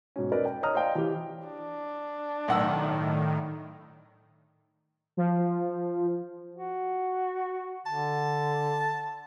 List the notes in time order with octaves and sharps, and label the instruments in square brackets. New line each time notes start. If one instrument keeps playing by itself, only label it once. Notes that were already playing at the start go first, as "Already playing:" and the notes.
[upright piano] G#2 B2 C#4
C#4 D#4 A#4 B4 D5
G5
C#5 D#5 A#5 D#6 F6
C5 D5 D#5 F5 G5
E3 G4
[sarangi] D4
[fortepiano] B1 F#5 E6 [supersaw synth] A2 D#3
[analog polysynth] F3
[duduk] F#4
[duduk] D3 [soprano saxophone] A5